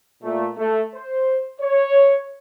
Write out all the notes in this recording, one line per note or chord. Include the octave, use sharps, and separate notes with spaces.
A#2 A3
A3
C5
C#5